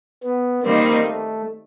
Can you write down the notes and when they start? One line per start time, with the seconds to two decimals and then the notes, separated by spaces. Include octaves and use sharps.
0.23 B3
0.63 D#3 G3 A#3 C4 D#4
1.05 A3